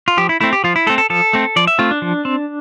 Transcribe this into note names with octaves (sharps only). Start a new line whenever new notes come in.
F4
F3 G4
E4
A3 C4 E4
G4
F3 F4
E4
A3 C4 A4
A4
F3 A4
A3 C4
F3 D5
E5
A3 C4 F4
D4
F3
C4